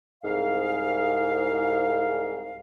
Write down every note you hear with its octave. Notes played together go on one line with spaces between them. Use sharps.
C2 G#2 F5